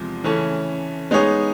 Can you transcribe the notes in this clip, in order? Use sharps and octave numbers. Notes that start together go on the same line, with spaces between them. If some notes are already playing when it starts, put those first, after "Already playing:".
Already playing: E2 C3 F3 G#3
C#3 E3 A3 C#4
G#3 B3 D#4 G#4 C#5